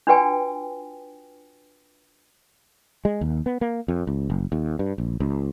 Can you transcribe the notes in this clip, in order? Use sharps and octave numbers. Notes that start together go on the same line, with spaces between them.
D4 F4 F#4 B4 G5 G#5
G#3
D#2
B3
A#3
F2
C#2
F#1
D#2
G2
A#1
C#2